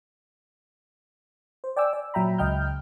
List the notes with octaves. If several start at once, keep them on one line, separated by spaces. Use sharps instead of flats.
C5
D5 G5 G#5 D6 E6
D5
A#2 F#3 E5 G5 A#5 B5
C#2 C#3 D#5 G5 F6 G6